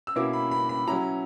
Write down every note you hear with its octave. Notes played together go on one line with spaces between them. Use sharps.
E6
B2 A#3 C#4 E4 D6
B5
B5
B5
F#3 C#4 E4 A#5